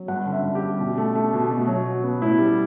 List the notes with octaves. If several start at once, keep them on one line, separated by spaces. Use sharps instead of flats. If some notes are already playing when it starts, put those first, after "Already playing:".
Already playing: F#3
G2 F#5
D3
E5
G2
G4
G3
B2
A3
A3
B2
B2
F#3
B2
B3
A2 E4
G3